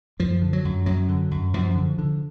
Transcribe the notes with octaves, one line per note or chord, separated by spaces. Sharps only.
F#2 F3
D3
F#3
F#2
F#2 F#3
D3
F#2
F#2 F3
D3
D3